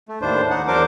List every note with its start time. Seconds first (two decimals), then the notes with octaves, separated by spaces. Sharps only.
0.09 A3
0.22 D#2 A2 D4 C5
0.50 D#4 F#5
0.67 E2 F#3 D4 A#4 C5 D6